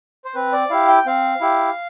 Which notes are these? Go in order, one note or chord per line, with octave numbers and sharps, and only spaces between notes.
C5
C4 B4
D5
E4 G4 F5
G5
C4 F5
E4 G4